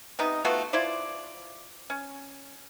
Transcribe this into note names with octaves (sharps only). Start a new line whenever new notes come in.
C3 B3 D#4
A3 B3 F4 F#4
E4 F4 C5 D5
C#4